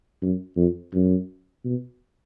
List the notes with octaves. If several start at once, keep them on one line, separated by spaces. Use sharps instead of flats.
F#2
F2
F#2
B2